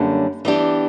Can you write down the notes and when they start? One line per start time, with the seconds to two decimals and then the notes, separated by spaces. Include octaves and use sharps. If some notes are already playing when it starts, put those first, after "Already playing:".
Already playing: F#2 D3 G3 A#3 C#4
0.45 E3 B3 D4 G4